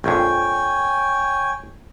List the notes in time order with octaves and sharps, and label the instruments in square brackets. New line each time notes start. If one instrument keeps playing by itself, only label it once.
[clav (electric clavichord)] A#1 F2 [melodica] C#5 G5 G#5